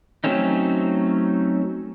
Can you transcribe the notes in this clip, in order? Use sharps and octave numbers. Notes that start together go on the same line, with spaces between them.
F#3 A3 C4 C#4 D#4